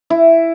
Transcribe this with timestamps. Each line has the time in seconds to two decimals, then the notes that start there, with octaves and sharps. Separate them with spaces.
0.10 E4